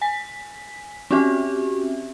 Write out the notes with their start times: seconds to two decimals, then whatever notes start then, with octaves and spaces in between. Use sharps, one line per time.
0.01 G#5 B6
1.11 C4 C#4 F#4 G4 E5